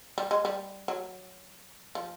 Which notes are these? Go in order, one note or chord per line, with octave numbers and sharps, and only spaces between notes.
G3
G#3
G3
F#3
F3